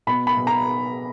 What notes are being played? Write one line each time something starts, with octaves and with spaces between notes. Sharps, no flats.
B2 B5
B5
B2
A#5